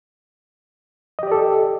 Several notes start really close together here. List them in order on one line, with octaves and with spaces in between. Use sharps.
D#5 G4 D5 A4